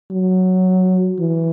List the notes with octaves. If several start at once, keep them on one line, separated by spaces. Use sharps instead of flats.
F#3
E3